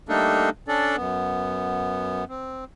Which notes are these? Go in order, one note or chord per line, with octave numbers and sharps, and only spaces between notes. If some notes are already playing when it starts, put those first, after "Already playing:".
G3 A3 A#3 D4 D#4 A4
C#4 D4 A4 D5
F#2 B3
C4